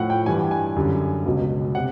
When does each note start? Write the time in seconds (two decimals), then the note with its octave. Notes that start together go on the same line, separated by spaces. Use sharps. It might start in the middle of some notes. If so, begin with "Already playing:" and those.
Already playing: A2 F3 F#5
0.10 G5
0.26 G2 E3 G3 G#5
0.51 G#5
0.76 F#2 D3 G3
1.26 C#2 B2 F#3
1.75 C3 F#5